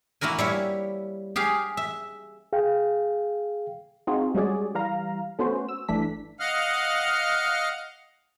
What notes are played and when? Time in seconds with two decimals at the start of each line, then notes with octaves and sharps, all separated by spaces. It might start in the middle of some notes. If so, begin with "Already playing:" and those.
0.21 A#3 E4 F#4 A#4 G#5
0.38 G3 E4 C#5
1.36 G4 G#4 F5
1.77 E5
2.53 G#4 F5 G5
4.07 C4 D#4 F4 F#4 G#4
4.35 G3 G#3 C#4 F#4 G#4 D5
4.74 E3 G3 F5 A#5
5.39 A3 B3 C#4 F#4 C5
5.69 E6
5.88 G1 E3 A3 D4 B6
6.40 D#5 F5 F#5 F6